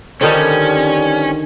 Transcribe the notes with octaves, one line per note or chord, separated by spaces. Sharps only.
D3 D#3 F3 G3 C#4 A5